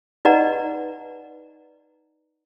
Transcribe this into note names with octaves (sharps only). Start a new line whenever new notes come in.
D#4 B4 D5 D#5 F#5 A#5